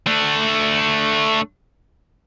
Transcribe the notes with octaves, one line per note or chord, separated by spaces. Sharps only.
A3 D4